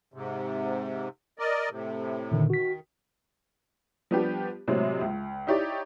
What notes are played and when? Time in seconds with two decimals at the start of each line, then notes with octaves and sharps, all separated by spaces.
0.14 G#2 C3
1.39 A#4 D5 D#5
1.70 A2 C3
2.31 A#2 D3 D#3
2.50 D#3 F#4 B6
4.11 F3 G3 B3 D4 G4
4.68 A2 C3 F#3 G#3 C4
5.01 C#2
5.47 D#4 E4 G4 C#5 D5